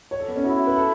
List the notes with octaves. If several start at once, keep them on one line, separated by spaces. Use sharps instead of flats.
C#5
A4
B3
C#4
E4 F#4
B4
A4